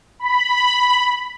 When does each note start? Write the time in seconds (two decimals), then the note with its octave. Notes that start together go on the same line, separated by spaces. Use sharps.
0.20 B5